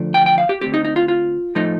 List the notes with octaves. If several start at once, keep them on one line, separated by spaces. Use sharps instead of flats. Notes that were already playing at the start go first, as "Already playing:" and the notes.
Already playing: D3 F3 A3 D4
G5
G5
F5
G4
D3 A3 C4 G4
D#4
D#4
F4
F4
A2 F3 A3 D#4